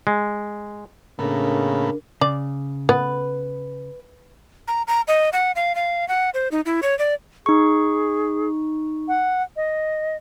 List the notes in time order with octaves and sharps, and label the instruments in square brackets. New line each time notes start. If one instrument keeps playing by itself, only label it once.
[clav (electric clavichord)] G#3
[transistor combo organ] A2 A#3 B3 [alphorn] C#3 [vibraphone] D4 A#4
[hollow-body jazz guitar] C#3 [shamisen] D5
[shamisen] B3 [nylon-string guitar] B4
[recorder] A#5
A#5
D#5
F#5
F5
F5
F#5
C5
D#4
E4
C#5
D5
[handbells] D#4 C#6 [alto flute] G#4
[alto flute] F#5
D#5